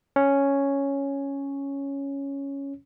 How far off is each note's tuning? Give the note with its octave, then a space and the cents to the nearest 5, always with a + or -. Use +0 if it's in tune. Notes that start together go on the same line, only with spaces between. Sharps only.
C#4 +0 C#5 +0